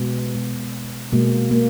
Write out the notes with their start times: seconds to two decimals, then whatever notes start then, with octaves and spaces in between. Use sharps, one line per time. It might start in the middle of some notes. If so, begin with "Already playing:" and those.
Already playing: B2 G#3 B3
0.35 B2 G#3
1.12 B2 G#3 A#3
1.51 A#3